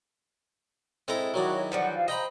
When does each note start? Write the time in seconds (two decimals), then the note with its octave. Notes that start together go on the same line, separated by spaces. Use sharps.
1.08 G#3 C4 E4 A4 A#5
1.34 D#3 F#3 F#4 C#5 D5
1.72 E3 F3 G3 F#5
1.96 F5
2.08 C5 D#5 G5 A#5 B5